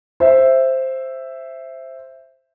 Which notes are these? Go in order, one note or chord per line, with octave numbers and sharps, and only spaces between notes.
C5 E5